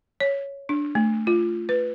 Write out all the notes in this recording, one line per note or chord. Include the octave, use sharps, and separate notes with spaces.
C#5
D4
A3
F4
B4